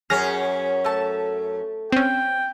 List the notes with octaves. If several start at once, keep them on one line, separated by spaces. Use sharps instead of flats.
F#2 C#4 G#4 F6 A#6
A3 A5
C4 C#4 G5